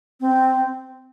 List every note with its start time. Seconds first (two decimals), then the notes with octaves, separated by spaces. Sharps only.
0.21 C4